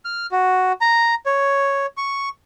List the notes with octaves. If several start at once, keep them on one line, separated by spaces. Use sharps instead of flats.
F6
F#4
A#5
C#5
C#6